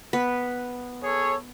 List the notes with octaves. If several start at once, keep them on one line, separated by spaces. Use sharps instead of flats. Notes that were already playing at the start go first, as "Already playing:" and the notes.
B3 B4
G#4 A4 C#5